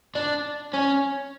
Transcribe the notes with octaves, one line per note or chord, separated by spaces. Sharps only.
D4
C#4